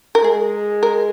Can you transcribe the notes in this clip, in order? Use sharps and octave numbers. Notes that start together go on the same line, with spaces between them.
A#4
G#3 G#4
A#4